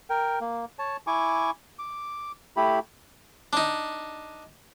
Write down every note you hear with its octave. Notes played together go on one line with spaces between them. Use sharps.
A#4 G5
A#3
C#5 A5
E4 G#5 C#6 D6
D6
A3 E4 G4 B5
D4 D#4